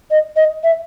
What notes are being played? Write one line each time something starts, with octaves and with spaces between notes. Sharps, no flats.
D#5
D#5
E5